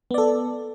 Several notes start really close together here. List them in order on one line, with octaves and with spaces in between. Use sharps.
B3 D5 A4